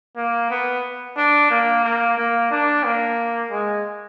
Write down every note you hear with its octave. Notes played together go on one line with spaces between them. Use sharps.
A#3
B3
D4
A#3
A#3
A#3
D4
A#3
G#3